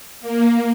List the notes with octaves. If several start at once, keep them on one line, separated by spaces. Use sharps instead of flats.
A#3